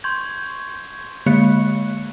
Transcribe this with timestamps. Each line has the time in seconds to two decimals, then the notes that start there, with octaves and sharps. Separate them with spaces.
0.04 C6 C#6 G6 G#6
1.26 D3 G#3 A#3 F#6 C#7